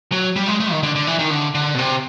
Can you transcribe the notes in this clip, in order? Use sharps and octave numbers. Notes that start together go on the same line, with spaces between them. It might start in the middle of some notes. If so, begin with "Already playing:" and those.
F#3
G3
G#3
A3
D#3
D3
D3
E3
D#3
D3
D3
B2
C3